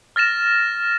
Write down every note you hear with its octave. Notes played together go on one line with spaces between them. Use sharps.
F6 A6 A#6 E7